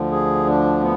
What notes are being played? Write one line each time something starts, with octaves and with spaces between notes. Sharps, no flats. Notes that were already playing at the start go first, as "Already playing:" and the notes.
Already playing: D2 D3 F3
G#4
D4
B3